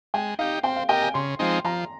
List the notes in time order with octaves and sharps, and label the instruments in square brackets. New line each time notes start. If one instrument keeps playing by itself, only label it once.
[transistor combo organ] G#3 [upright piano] G5
[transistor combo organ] D#4 G4 [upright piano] F5
[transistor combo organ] C4 [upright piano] G5
[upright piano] F5
[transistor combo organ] G4 A#4 D#5 [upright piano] G5
[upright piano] G#5
[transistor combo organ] C#3 [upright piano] C6
[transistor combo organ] F3 G#3 C4 D#4
[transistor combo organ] F3 [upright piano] A#5